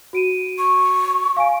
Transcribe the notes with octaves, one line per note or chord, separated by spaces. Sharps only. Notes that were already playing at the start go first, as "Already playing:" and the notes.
F#4 D7 D#7
C#6
F5 G#5 D7